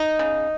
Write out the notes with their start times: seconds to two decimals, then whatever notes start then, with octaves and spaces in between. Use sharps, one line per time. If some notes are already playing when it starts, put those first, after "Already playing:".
Already playing: D#4
0.19 C#3